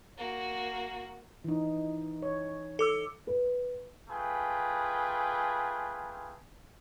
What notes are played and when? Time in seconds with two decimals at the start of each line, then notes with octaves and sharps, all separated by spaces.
0.18 A#3 F#4
1.44 E3 D#4
2.22 C#5
2.79 A4 D6 E6
3.27 B4
4.10 A3 F4 G#4 B4 G5